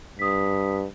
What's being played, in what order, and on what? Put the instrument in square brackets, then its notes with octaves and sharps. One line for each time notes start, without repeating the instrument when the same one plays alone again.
[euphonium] G2 [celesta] D#6 B6